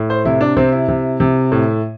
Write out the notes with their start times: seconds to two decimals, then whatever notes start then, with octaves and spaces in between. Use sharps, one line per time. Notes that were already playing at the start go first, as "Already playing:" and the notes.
Already playing: A2
0.10 C5
0.25 C3 E4
0.41 D4
0.56 C3 C4
0.72 E4
0.88 C3
1.20 C3
1.52 A2